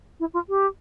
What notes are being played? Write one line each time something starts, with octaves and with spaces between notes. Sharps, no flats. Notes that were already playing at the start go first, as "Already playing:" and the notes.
E4
F4
G4